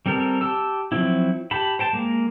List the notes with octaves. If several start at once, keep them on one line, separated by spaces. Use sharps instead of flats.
G3 C4 A4 A#4
G4 A5 E6
F3 F#3 C4 E4
G4 A5 B5
C5 G5 A5
G#3 A#3